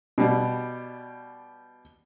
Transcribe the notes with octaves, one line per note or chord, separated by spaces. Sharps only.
B2 G3